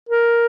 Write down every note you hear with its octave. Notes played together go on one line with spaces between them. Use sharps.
A#4